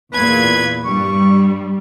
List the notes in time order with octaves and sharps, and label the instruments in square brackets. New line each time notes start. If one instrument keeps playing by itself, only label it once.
[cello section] E2 [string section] A#2 G#6 [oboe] B4
[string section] G2 [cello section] G3 [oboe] C#6